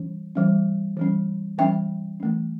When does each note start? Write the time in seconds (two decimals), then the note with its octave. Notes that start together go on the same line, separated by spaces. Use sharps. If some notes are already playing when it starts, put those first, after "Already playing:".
Already playing: E3 G3 C#4
0.35 E3 G3 C#4
0.97 E3 G3 C#4
1.58 E3 G3 C#4 E5 G5
2.20 E3 A3 C#4